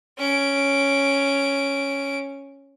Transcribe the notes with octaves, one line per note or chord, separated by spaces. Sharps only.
C#4 D7